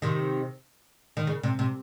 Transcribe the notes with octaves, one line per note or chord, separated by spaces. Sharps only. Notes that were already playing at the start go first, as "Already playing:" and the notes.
C3 D#3
D#3
C#3
C3
C3